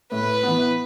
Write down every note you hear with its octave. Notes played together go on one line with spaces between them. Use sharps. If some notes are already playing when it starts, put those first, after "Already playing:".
A2 B4
E3 B3